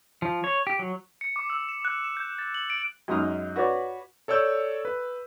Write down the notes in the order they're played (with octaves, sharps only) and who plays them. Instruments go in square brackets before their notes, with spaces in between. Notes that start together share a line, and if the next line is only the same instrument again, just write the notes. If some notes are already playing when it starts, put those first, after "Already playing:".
[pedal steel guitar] F3
C#5
G4
F#3
[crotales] C#7
D6
E6
E7
F#6
E7
G6
A6
F#7
D7
[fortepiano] F#2 G#3 D#4 D#6 F6
F#4 B4 C#5 D5
[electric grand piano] A4 C#5 D5 E6 G6
B4